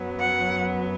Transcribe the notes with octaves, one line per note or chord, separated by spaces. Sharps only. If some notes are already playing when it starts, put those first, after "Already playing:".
Already playing: F#2 F#3 B3
F#5